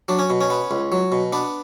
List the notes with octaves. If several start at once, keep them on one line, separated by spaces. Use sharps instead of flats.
F#3 D4
C#4
B2
C#4
B3
C#2
F#3
B2
B3 D4